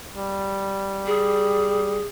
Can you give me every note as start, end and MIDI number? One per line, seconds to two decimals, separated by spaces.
0.16 2.03 55
1.07 2.06 68